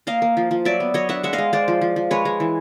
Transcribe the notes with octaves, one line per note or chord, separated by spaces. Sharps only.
A#3 D#5 F5
A#3
F3
F3
F#3 D5 E5
B3
F#3 C#5 D#5
D4 E5 F#5
G#3 E5 F#5
D#5 F5
G#3
G#3 C5 D5
F3
F3
F3
G#3 B4 C#5
G#3
E3